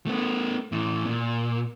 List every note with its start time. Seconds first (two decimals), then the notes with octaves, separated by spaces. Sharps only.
0.06 A3 B3
0.72 A2 E3
1.06 A#2